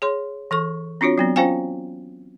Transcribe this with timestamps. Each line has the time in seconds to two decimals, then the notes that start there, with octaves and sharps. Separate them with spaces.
0.02 G#4 C#5 C6
0.51 E3 A4 C#6
1.01 C4 D4 F4 F#4 C#5
1.18 F#3 B3 C4
1.36 C#4 F4 C5 F5 G5 G#5